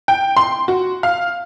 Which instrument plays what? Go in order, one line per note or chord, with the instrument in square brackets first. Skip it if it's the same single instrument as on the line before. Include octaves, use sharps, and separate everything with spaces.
[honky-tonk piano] G5
C6
F#4
F5